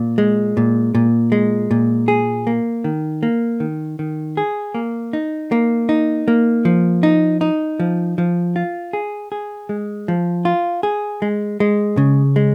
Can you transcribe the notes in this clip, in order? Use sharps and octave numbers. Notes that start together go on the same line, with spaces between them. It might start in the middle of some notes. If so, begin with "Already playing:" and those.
Already playing: A#2
G#3
A#2
A#2
G#3
A#2
G#4
A#3
D#3
A#3
D#3
D#3
G#4
A#3
D#4
A#3
D#4
A#3
F3
D#4
D#4
F3
F3
F4
G#4
G#4
G#3
F3
F4
G#4
G#3
G#3
C#3
G#3